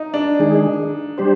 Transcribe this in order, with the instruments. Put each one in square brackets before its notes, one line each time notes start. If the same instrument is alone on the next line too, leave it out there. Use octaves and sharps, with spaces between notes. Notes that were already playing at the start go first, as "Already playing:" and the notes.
Already playing: [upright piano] D#4
D4
[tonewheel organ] D#3 G#3 D#4 G#4
G3 D4 G4 C5